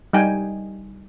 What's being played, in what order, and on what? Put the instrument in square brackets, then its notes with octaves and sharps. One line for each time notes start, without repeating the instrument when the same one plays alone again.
[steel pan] G3 D#4 G5 G#5